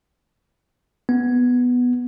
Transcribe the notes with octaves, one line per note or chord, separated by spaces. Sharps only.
B3